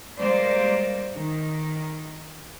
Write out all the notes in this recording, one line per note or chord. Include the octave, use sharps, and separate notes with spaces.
G3 G#3 A#3 C5 D5
D#3